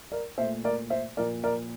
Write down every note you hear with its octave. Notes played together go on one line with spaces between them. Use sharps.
A#4 D5
A#2 A3 C5 E5
A#4 D5
C5 E5
A#2 F3 A#3 A#4 D5
A#4 D5